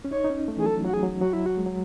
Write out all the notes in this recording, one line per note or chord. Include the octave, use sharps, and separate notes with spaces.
C#4
D#4 C#5
D#4
C#4
A3
E3 G#4
F#3 A4
F#3 F#4
G#4
F#3
F#3 F#4
E4
F#3 F#4
G#3
F#3